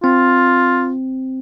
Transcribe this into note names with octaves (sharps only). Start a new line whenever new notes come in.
C4 F4